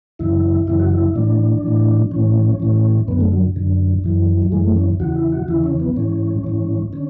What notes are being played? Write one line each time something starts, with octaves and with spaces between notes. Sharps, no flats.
F#2 C#3 E3 E4
F#2 C#3 E3 E4
F#4
E4
A2 E3 D4
A2 E3
A2 E3 C#4
A2 E3
F#2 D3 B3
A3
F#3
F#2 D3
F#2 E3
F#3
F#2 E3 G#3
A3
C#4
E2 C#3 E3 F#4
E4
F#4
E2 C#3 E3 E4
C#4
B3
G#2 E3 C#4
G#2 E3
D3 C#4